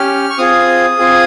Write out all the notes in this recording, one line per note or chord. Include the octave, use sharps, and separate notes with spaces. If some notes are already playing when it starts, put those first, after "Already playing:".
Already playing: C#4 G4 F6
C#6
C4 F4 G#4 D#6
C4 F4 G#4